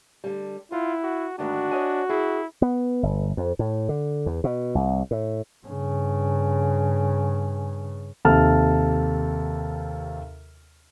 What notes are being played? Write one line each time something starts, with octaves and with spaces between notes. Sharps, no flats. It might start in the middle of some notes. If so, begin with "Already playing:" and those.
D3 G3
E4 F4 F#5
F#4
D2 G#2 D#3 D4 F#4
C#5 D#5 G#5
E4 G#4
B3
G1
F2
A2
D3
E2
B2
C2
A2
G2 C#3
D#2 C3 A4 A5 F6